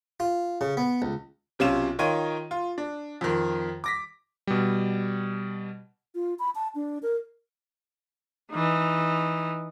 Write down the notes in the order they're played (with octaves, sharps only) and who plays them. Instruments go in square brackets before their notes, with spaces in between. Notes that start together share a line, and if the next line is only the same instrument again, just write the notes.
[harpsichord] F4
C#3
B3
C#2
[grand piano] B1 C3 C#4 F4 E7
D#3 D#4 F4 C#5 G5 D#7
F4
D4
F2 D#3
D6 A#6 B6
[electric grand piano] B2 G3
[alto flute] F4
B5
A5
D4
A#4
[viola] E3 D#4